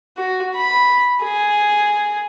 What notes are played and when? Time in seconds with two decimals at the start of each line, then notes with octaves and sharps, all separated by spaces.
0.18 F#4
0.56 B5
1.24 G#4